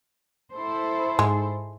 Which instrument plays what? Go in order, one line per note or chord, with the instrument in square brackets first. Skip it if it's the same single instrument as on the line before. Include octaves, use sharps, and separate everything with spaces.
[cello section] E4 A4 C5
[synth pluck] G#2 [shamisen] G#3